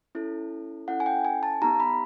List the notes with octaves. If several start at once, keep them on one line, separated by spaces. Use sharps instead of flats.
C#4 E4 A4
C#4 E4 A4 F#5
G#5
G5
G#5
A5
B3 D#4 G4 A#5
B5